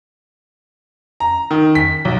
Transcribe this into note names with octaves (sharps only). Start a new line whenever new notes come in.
A#5
D#3
B6
B1